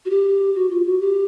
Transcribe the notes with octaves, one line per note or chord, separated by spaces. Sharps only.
F#4
G4
F#4
F4
F#4
G4